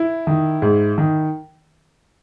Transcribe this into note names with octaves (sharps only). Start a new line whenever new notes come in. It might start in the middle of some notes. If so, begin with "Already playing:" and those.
Already playing: E4
D#3
G#2
D#3